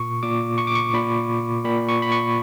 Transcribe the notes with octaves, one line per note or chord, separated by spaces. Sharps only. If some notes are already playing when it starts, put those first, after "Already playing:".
Already playing: A#2 C#6
A#2 D6
C#6
D6
C#6
A#2 B5
A#2 B5
C#6
B5
C#6